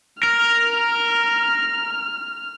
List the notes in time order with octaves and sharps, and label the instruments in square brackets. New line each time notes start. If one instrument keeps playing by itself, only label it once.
[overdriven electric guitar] A#4 [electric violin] F6